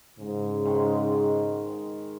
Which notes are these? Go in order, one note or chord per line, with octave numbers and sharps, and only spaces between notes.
G#2 C#3
D#3 G#3 G5